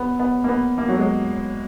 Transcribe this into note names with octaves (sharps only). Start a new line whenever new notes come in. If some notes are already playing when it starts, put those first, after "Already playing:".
Already playing: B3
B3
A#3
B3
A#3
F#3
G#3